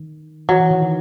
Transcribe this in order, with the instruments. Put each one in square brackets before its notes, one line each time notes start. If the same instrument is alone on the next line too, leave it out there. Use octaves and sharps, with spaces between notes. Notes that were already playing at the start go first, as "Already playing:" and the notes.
Already playing: [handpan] D#3
[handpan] E3 [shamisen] F#3
[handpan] E3
D#3
D#3